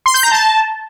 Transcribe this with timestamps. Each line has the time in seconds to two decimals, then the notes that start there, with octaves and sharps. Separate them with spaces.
0.06 C6
0.14 G6
0.23 A#5
0.32 A5